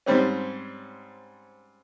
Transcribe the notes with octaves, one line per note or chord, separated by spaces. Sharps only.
G#2 G3 C4 C#4